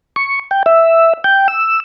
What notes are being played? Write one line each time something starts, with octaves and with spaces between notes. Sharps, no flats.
C#6
G5
E5
G5
E6